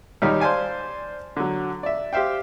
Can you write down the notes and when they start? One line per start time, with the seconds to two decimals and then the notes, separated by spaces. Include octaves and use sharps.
0.22 D#2 G3 D#4 G4 C#5 F6
0.40 C5 D5 F5 G#5 A5
1.37 D3 F#3
1.83 D5 E5
2.13 G4 C5 E5 F5 G5